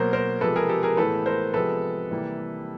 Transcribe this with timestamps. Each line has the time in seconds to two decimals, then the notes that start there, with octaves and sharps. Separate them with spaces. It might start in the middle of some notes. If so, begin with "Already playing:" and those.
Already playing: B2 F#3 A#3 A#4 C5
0.13 A#4 C5
0.41 C3 F3 G#3 A4 B4
0.56 G#4 A#4
0.69 G4 A4
0.83 G#4 A#4
0.97 A2 E3 G#3 B3 A4 B4
1.26 A#4 C5
1.54 C3 F3 G#3 B3 A4 B4
2.11 C3 E3 G3 A#3